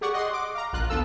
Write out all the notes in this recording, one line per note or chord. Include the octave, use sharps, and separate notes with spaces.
G4 G#4 D5 F#5 C#6
D#5 F#5 C6
D6
F5 A#5
A#1 F4 F#6
D2 B3 F4 A4 E6